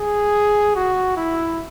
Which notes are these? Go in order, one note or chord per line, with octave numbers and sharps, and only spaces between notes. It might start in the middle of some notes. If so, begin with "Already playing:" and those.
Already playing: G#4
F#4
E4